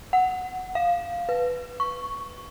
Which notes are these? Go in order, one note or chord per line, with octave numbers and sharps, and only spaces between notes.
F#5
F5
B4
C#6